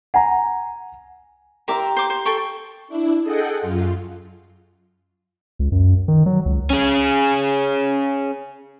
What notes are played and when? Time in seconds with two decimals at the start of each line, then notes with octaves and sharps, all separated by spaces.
0.14 F#5 G#5 A#5
1.68 G4 A#4 E5 A#5 C6 D6
1.97 C5 D6
2.10 C5
2.26 A4 G5 C#6
2.88 D4 E4
3.22 G#4 A4 D#5 F#5 G5
3.59 F#2 F4
5.59 C#2
5.72 F#2
6.08 D#3
6.26 F#3
6.46 C#2
6.70 C#4 G#4